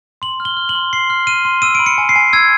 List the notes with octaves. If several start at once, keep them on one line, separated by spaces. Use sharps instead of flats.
C6 F#7
F6
G7
F6
F#7
C6
C6 C7
F6
F6 D#7
C6
E6 D#7
B5 D7
C#7
G#5
C7
G#5
E6 G#6